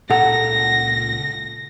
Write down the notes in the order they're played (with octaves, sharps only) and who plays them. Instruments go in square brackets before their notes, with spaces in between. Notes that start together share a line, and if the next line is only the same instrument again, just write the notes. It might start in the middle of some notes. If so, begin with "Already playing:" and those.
[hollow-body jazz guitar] C#2 A#2 A4 [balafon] F#5 [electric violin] A#6